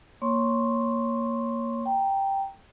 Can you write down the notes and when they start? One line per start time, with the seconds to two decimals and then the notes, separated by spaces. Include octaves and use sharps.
0.22 A#3 C#5 C6 C#6
1.86 G5 A#5